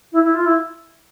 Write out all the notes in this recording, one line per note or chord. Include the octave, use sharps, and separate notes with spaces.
E4
E4
F4
E4